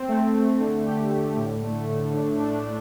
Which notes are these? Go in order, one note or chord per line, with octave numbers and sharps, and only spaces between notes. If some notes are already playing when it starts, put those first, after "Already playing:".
Already playing: C4
A3
A3
D3
G4
D3
A2
A3
A2
D4
D4